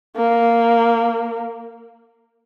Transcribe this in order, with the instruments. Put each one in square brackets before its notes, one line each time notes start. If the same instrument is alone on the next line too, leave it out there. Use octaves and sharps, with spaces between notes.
[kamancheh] A#3